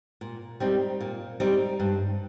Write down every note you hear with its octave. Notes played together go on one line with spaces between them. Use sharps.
A#2
G3 C4 D#4
A#2
G3 C4 D#4
G2